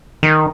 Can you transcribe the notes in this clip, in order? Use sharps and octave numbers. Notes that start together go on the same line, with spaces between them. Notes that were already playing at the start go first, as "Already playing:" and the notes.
D#3